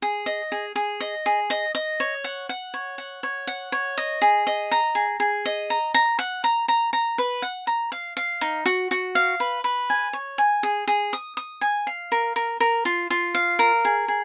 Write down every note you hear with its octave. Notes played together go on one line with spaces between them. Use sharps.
G#4
D#5
G#4
G#4
D#5
G#4
D#5
D#5
C#5
F#5
F#5
C#5
F#5
C#5
F#5
C#5
D#5
G#4
D#5
A#5
G#4
G#4
D#5
A#5
A#5
F#5
A#5
A#5
A#5
B4
F#5
A#5
F5
F5
D#4
F#4
F#4
F5
B4
B4
G#5
C#5
G#5
G#4
G#4
D#6
D#6
G#5
F5
A#4
A#4
A#4
F4
F4
F5
A#4
G#4
G#4